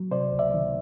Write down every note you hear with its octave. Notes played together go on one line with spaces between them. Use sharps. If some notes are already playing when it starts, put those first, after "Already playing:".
Already playing: F#3
C3 C5 D5
C#2
D5 E5
D#3